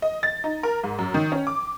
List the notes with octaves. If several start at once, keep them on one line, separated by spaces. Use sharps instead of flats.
D#5
A6
D#4
A#4
G#2
F#2
D#3
C#4
D6